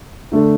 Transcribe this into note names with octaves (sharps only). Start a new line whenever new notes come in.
D3 A3 D4 A4